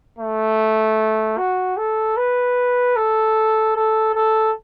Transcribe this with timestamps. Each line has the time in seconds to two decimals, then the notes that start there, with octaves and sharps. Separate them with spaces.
0.19 A3
1.38 F#4
1.77 A4
2.17 B4
2.96 A4
3.76 A4
4.15 A4